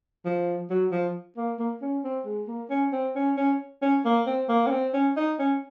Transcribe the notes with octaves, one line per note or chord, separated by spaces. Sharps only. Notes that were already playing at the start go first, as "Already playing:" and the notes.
F3
F#3
F3
A#3
A#3
C#4
C4
G#3
A#3
C#4
C4
C#4
C#4
C#4
A#3
C4
A#3
C#4
C4
C#4
D#4
C#4